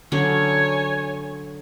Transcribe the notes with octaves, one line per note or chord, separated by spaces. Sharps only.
D3 F#3 C#4 C#5 G#5